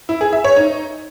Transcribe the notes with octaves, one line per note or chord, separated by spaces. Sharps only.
E4
G#4
E5
C#5
D#4